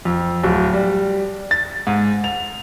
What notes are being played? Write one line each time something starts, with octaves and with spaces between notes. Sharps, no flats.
F2
D1
G3
A6
G#2
F7